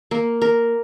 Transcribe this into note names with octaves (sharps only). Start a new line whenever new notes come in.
A#3
A#4